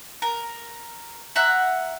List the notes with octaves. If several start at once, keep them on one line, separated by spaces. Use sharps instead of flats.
A#4
E5 F#5 A#5 F#6